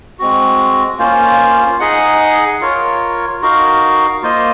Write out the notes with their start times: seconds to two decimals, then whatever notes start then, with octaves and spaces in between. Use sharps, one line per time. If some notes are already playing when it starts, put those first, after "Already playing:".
0.19 G#3 C4 F#4
0.99 A#3 C#4 F4 C5
1.80 D#4 G#4 D#5 F#5
2.61 F4 A#4 C#5
3.42 D#4 F#4 A#4 F5
4.22 A#3 F4 C5 D#5